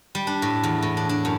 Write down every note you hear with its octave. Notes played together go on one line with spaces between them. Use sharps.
G3
D4
A2
E2
A2
D4
D4
F#2